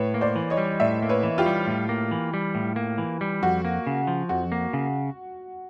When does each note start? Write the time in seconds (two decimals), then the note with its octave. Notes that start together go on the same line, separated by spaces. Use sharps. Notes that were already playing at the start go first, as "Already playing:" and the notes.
Already playing: A2 B4 C#5
0.14 A#3
0.21 C5 D5
0.36 E3
0.50 C#5 D#5
0.57 G3
0.80 A2 D5 E5
1.02 A#3
1.09 B4 C#5
1.23 E3
1.38 F4 G4
1.46 G3
1.67 A2
1.89 A#3
2.11 E3
2.34 G3
2.55 A2
2.76 A#3
2.98 E3
3.21 G3
3.42 F2 F#4
3.65 A#3
3.87 C#3
4.07 F3
4.29 F2 F#4
4.52 A#3
4.73 C#3